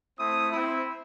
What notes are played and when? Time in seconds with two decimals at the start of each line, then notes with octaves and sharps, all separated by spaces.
0.19 A3 C4 E4 D#6
0.51 C4 E4